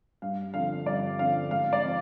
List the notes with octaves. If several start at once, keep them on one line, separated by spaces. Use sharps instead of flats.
G2 F5
D3 F3 C4 F5
G2 D5
D3 F3 C4 F5
G#2 F5
D5
F3 C4